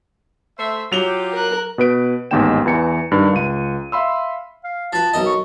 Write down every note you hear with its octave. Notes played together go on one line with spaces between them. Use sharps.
A3 C5 E5
F#3 F4 G4 F7 G7
A#4 F#6
B2 B4 D7
A1 D#2 G#2 B3 G5 E7
E2 E3 C#7
G2 D#3
C#2 D#7
E5 F5 B5 C6 E6
F5
F3 B4 A5
B1 A#4 D#5
C#6